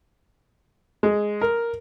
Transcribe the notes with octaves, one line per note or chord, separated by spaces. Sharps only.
G#3
A#4